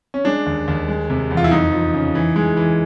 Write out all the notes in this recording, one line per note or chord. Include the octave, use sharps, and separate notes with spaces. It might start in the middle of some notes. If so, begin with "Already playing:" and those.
C#4
G#3 D4
D#2
D#2
G#3
C3
E2
F4
E4
F2 D#4
F3
C#3
E3
G#3
E3